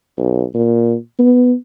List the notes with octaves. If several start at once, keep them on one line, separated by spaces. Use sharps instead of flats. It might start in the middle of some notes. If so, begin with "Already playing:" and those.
B1
A#2
B3